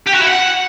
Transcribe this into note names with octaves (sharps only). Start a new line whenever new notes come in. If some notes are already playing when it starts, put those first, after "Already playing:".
G4
F#4
E4
F#5